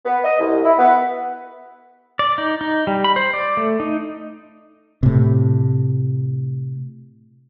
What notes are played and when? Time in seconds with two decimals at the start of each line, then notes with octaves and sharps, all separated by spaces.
0.05 B3
0.23 D#5
0.39 C2
0.64 E4
0.77 B3
2.19 D5
2.38 D#4
2.61 D#4
2.87 G3
3.04 B5
3.16 C5
3.34 D5
3.57 A3
3.80 D#4
5.03 A2 C3